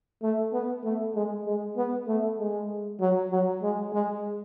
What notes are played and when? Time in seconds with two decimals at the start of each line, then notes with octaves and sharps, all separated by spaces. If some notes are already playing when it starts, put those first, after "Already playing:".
0.23 A3
0.53 B3
0.84 A3
1.15 G#3
1.46 G#3
1.77 B3
2.08 A3
2.39 G#3
3.00 F#3
3.31 F#3
3.62 G#3
3.93 G#3